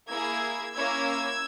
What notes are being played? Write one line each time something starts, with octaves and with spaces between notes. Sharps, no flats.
A#3 E4 G#4 E6 G#6
A#3 C#4 E4 E6 G#6